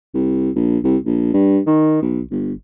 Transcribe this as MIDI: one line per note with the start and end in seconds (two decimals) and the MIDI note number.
0.14 0.50 36
0.55 0.78 34
0.84 0.97 36
1.05 1.33 34
1.33 1.60 43
1.67 1.98 51
2.02 2.22 35
2.31 2.53 31